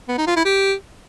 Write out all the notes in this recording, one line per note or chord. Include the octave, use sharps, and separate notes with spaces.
B3
D#4
F4
E4
G4